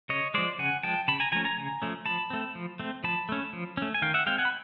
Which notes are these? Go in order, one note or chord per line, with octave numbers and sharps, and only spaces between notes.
C#3 C#5 D#5
F3 G#3 C5 D5
C#3 F#5 G#5
F3 G#3 G5 A5
C#3 A5 B5
G#5 A#5
F3 A3 C#4 G#5 A#5
G#5 A#5
C#3
F3 A3 C#4
F3 A5 B5
A3 C4
F3
A3 C4
F3 A5 B5
A3 C#4
F3
A3 C#4
G#5
D#3 F5 G5
E5 F#5
G#3 C4 F5 G5
F#5 G#5
B5